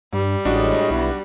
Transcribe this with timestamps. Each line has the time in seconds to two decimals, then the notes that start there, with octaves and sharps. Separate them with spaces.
0.13 G2 G3
0.45 A1 A2 G#3 D4 F#4 D#5
0.90 B1 B3 E4